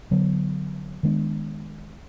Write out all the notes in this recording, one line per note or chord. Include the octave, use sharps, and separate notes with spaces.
D3 F#3 B3
D#3 G#3 B3 D4